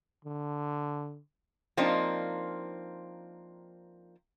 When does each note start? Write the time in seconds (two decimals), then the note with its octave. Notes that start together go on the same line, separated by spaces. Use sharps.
0.25 D3
1.77 F3 A#3 C4 D4 D#4